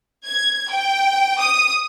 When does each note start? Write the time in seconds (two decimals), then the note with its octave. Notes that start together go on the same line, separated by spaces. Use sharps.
0.25 G#6
0.70 G5
1.38 D#6